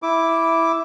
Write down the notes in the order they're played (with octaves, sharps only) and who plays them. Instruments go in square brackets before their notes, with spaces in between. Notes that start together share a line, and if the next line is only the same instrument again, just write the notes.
[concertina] E4 D6